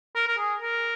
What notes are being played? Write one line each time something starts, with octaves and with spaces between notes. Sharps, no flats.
A#4
A#4
G#4
A#4